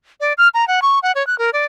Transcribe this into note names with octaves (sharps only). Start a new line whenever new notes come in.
D5
F6
A#5
F#5
C#6
F#5
C#5
F#6
A#4
D5